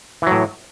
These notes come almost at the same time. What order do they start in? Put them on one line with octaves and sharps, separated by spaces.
E3 F#3 A2